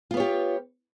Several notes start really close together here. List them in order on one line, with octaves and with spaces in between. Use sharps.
F4 B3 C#5 G4